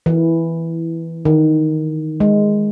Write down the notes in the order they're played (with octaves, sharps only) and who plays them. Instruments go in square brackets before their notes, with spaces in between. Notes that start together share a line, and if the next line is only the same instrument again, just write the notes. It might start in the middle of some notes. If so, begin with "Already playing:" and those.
[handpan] E3
D#3
G#3